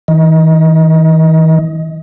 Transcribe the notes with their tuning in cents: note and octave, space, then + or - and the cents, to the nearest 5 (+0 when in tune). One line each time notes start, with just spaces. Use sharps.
E3 -40 D#5 +30